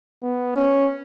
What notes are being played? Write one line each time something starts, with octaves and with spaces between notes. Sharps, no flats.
B3
C#4